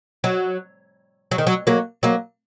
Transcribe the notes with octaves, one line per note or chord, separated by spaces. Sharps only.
F#3
F#3
D#3
F#3
F#3 A#3
F#3 A#3